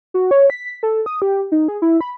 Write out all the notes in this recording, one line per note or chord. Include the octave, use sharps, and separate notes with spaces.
F#4
C#5
B6
A4
D#6
G4
D#4
G#4
E4
B5